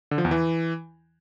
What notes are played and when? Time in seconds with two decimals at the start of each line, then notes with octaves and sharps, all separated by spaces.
0.11 D3
0.18 F3
0.25 E2
0.31 E3